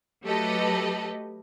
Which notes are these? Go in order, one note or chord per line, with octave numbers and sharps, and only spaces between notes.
F#3 A3 G4 A4 B4 D#5